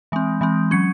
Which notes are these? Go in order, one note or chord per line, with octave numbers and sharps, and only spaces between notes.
E3 G#3 C4
E3 G#3 C4
F#3 C#4 C#7